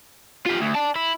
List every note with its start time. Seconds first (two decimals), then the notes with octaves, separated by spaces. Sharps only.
0.46 F4 G4
0.60 D2
0.75 D5 A5
0.95 E4